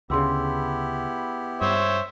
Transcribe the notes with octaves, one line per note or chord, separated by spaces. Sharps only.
D2 C#3 B3 E4 G4 G#4 C6 E6
G2 C5 C#5 E5